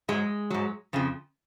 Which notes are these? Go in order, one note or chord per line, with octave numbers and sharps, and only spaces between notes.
G#2 F#3 G#3
G#2 F#3
F2 C#3 F3